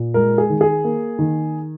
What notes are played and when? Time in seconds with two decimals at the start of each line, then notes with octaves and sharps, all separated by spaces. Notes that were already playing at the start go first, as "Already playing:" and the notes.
Already playing: A#2
0.14 G#3 A#4
0.38 G#4
0.49 D#3
0.61 G#4
0.84 A#3
1.19 D#3